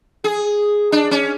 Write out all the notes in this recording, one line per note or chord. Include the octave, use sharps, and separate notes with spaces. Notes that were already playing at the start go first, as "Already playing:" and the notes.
G#4
D4
C#4